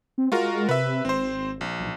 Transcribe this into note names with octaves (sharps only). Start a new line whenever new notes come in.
C4
G#3 F4 F#4 A#4
C3 B4 E5
G#1 C4 C5
A#1
B1